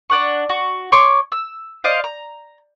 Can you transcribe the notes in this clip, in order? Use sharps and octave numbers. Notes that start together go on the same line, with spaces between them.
D4 F#5 C#6
F#4
C#5 C6 D6
E6
C5 D5 D#5 F5
A#5